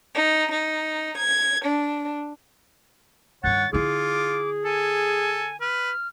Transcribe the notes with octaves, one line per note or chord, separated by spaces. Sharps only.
D#4
D#4
G#6
D4
G2 D#3 C#5 F#5 A6
D3 E4 F4 G#4 D6
A4 G#5
B4 F6